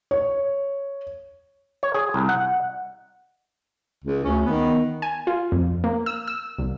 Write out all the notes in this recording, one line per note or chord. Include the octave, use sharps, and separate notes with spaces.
C#5
C#5
G#4
C2
F#5
C#2
D2 C#4
D#3 B3
G#5
F4
F2
A#3
E6
E6
C2